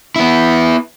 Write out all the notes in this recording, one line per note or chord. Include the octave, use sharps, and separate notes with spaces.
B3 E4